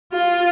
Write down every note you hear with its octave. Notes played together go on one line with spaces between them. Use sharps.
F4